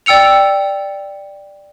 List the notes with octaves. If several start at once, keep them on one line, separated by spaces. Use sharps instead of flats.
D5 G5 E6 C#7 F7